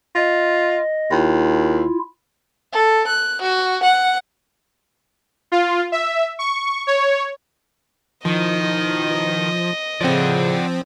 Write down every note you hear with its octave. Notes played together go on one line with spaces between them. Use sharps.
F4 D#5
D#2 E4 F4
A4
F#6
F#4
F#5
F4
E5
C#6
C#5
B2 D#3 F3 D#4 E4 D#5
A2 C#3 F3 C4 D5 F#5